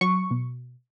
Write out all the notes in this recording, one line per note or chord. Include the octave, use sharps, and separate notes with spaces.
F#3 C#6
B2